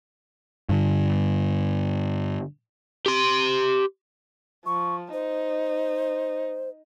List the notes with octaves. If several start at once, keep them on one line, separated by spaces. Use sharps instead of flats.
G2 D3
G4 C6
F3 C#6
D#4 C5